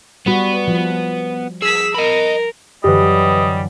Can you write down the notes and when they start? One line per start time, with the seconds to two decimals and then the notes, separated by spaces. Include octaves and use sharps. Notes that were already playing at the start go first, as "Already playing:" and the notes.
0.26 G3 B3 F#4 B4
0.68 F3
1.62 G#4 E6 B6
1.94 A#4 D#5 B5
2.84 F#2 D3 E3 G3 G4 B4 D#5